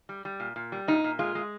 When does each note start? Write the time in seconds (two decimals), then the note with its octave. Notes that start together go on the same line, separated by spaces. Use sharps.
0.09 G3
0.25 G3
0.40 A#2
0.56 A#2
0.72 G3
0.88 A#2 D#4
1.04 A#2
1.19 G#3 F4
1.35 G#3